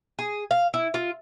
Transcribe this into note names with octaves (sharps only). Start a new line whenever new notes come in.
G#4
F5
E4
F4